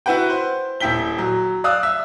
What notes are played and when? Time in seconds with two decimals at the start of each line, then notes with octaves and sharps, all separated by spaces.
0.06 E4 F#4 B4 F#5 G5
0.30 C5
0.80 D#1 E4 G5 B6 G7
1.18 F#3
1.64 D5 F5 D#6 E6 F#6
1.83 E5 E6